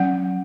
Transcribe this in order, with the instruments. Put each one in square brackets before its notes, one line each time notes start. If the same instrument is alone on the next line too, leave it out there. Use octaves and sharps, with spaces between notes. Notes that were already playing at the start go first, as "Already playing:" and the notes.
Already playing: [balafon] F#3 C#4 F#5